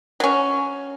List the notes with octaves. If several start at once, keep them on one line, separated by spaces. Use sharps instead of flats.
F#3 C#4